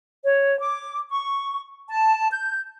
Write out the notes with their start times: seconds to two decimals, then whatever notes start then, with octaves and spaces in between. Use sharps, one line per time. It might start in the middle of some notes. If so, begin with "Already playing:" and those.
0.24 C#5
0.59 D6
1.09 C#6
1.89 A5
2.32 G6